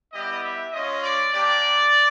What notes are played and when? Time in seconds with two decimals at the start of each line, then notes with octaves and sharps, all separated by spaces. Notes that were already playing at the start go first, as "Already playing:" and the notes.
0.13 G3 B3 E4 G4 D#5
0.43 E5
0.72 G#3 C#4 F4 D#5
1.02 D5
1.33 A#3 D4 G4 D5